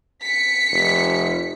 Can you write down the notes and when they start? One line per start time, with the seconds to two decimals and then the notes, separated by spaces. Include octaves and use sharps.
0.22 B6 C#7
0.72 F1